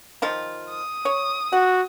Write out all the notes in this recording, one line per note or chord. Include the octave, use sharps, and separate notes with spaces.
D#3 F3 F4
D#6
C#5
F#4 F#5